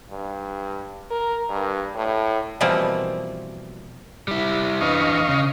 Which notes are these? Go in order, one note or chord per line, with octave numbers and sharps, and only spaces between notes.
G2
A#4
G2
A2
B2 E3 F3 G3 A#3 C4
G3 E4
E2 D4 B4 D#5 F5 C#6
C#3